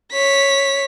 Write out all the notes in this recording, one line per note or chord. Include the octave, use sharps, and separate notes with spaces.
C#5 B6